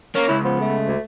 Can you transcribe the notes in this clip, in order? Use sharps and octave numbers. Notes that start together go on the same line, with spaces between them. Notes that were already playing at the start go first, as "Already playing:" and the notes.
A#3 C#4
C#2 E4
F3 B3
A3
D2